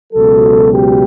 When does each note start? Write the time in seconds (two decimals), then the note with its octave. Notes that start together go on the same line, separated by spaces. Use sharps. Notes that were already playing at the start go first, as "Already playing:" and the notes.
0.13 C#2 B2 F#3 A4
0.70 G4